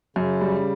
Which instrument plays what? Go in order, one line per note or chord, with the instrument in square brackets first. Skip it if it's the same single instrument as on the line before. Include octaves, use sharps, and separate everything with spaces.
[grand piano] F#2 [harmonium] C#3
[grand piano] G3